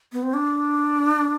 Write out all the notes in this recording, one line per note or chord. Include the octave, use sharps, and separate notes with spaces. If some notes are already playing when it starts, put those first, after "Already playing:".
B3
C4
D4